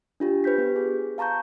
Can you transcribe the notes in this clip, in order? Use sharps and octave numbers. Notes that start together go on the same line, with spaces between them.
D4 F4 G4
B4 C5 G6 B6
B3 G4
G#4
F5 A5 A#5 C#6 G6